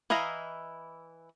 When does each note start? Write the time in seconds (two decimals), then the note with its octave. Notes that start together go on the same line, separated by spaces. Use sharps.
0.10 E3 E4 D#5 F5 A#5